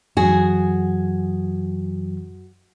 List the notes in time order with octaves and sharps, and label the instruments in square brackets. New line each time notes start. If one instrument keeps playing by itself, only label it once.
[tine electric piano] F#2 E3 F#3 [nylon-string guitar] F#4 G#4